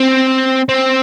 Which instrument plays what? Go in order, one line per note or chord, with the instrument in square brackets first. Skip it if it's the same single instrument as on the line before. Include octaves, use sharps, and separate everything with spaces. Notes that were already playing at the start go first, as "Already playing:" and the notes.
Already playing: [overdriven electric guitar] C4
C4